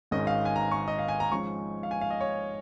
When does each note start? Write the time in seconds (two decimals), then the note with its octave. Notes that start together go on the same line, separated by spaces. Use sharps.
0.11 G#1 G#2 D#3 G#3 C#4 D#5
0.27 F5
0.45 G#5
0.56 A#5
0.72 C#6
0.88 D#5
0.99 F5
1.08 G#5
1.20 A#5
1.31 G#2 F3 G#3 C#4 C#6
1.83 F5
1.91 G#5
2.01 F5
2.10 D#5
2.21 C#5